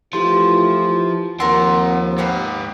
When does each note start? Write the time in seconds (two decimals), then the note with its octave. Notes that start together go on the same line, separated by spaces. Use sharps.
0.13 E3 F3 A3 E4 F4 G4 C6
1.40 D#2 F3 C4 A#4 F#5 A#5 C6 E6
2.18 G#2 A#3 B3 G4 F5